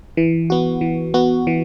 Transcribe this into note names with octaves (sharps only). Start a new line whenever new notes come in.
E3
B3 F#4
E3
B3 F#4
E3